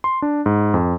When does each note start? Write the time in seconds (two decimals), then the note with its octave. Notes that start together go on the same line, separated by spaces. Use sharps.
0.04 C6
0.22 D4
0.46 G#2
0.74 F2